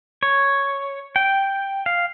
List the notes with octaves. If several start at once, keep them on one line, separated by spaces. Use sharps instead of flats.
C#5
G5
F5